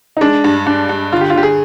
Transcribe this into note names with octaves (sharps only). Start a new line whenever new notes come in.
D#4
G#3 D4
G2
G2 D4
G2
D3 F4
G4
F4
D3 G4
G#4